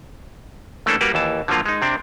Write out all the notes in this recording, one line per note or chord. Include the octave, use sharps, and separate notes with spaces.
E3 A3 A#3 C#4 D4 A4
G3 A#3 F#4 A#4 B4
D#2 E3 A5
D3 F3 F#3 A#3 F4
G#3 D#4
C3 C4 D4